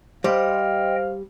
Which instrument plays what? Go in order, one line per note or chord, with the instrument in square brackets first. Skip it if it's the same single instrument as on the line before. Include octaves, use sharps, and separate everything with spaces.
[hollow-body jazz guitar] G3 [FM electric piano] C5 [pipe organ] D#5 G5 [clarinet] F5